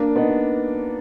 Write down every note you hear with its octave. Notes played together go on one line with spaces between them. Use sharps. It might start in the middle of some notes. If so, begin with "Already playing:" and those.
Already playing: A#3 D4
B3 D#4